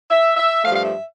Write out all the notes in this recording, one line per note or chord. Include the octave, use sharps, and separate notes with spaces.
E5
E5
G2 F3 A3 F5
F5
E5